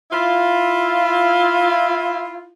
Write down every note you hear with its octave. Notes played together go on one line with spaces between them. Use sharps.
E4 F4